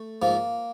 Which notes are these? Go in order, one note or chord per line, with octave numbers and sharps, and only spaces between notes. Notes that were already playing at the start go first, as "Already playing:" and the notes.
Already playing: A3
G#2 F3 A#3